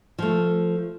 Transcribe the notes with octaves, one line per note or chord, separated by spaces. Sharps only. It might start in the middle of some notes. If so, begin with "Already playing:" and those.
F3 A3